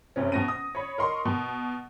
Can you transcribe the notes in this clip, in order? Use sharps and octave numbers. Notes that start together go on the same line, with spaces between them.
F#1 C3 C#4
B2 A#6 D#7
D#6
C#5 B5
A#4 D#5 C6 C#6
B2